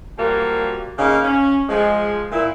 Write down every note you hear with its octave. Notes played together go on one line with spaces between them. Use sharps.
F3 G3 A#3 F#4
C#3 A#3 D#4 F5
C#4
F3 G#3
A#2 E4